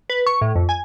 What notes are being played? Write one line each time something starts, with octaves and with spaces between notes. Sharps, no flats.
B4
C#6
A2
F2
G#5